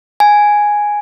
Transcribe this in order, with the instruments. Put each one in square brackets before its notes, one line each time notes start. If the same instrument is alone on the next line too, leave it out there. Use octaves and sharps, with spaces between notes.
[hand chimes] G#5